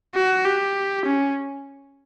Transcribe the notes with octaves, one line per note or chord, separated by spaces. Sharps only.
F#4
G4
C#4